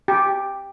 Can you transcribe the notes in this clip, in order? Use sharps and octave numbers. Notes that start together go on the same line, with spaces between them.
G4